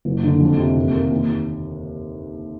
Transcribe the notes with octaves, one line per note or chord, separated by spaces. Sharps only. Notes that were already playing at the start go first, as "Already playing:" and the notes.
F#1
D3
F2
C3
D#2
A#3
D#2